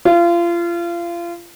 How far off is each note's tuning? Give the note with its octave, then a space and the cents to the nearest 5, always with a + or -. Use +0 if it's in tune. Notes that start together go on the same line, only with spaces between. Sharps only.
F4 -30